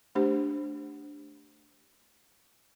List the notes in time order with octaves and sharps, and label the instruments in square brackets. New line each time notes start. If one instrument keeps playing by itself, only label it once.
[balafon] A3 D4 G4 C5